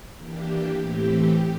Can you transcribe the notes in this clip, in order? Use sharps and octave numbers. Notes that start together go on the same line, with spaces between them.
E3 A#3 D4 G4
A2 E3 A3 C4 G4